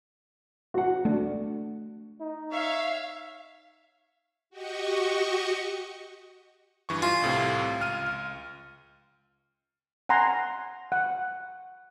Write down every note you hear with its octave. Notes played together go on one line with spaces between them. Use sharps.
F#4 F#5
A3 D4
D#4
C#5 E5 F5
F#4 G4 D#5 C#6
G2 E3 C#6
F4 G#5
C2 A2 C3
C#2 F6 D#7
F#5 G#5 A#5 C6
F#5